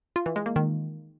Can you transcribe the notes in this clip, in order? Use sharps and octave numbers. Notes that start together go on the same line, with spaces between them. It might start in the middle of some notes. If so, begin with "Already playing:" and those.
F4
E3
G#3
A#3
D#3